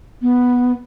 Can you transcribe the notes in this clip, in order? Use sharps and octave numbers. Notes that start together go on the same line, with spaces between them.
B3